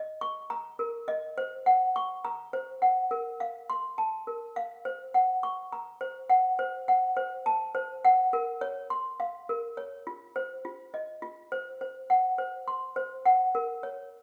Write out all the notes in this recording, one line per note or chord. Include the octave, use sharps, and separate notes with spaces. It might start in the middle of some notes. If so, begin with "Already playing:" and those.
Already playing: D#5
C#6
A#5
A#4
D#5
C5
F#5
C#6
A#5
C5
F#5
A#4
F5
C6
A5
A#4
F5
C5
F#5
C#6
A#5
C5
F#5
C5
F#5
C5
A5
C5
F#5
A#4
C#5
C6
F5
A#4
C#5
F4
C5
F4
D#5
F4
C5
C5
F#5
C5
C6
C5
F#5
A#4
C#5